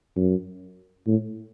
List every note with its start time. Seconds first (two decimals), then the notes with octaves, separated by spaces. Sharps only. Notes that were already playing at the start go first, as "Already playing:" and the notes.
0.16 F#2
1.07 A2